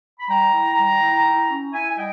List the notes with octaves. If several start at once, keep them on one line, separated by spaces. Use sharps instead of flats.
B5
G3 G5 A#5
E4
G3
E4
E4
C#4
E4 E5 G#5
G#5
G3 D#5 G5